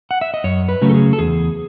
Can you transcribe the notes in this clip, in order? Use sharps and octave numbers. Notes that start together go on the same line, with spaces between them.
F#5
E5
D#5
F#2 C#5
B4
C#3 F#3 A3 C#4
A4
G#4
A4
E2 G#4